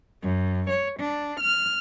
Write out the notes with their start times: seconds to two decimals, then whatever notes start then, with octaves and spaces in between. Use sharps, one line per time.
0.22 F#2
0.70 C#5
0.98 D4
1.40 F6